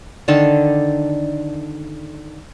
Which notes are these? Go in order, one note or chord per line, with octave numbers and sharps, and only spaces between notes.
D3 D#3 D4 A4